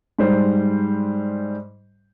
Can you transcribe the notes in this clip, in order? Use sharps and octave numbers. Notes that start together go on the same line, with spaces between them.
G#2 G3 C5